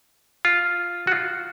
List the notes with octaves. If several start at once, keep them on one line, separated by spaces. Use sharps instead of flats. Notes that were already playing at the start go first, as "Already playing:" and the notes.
F4
F#4
F4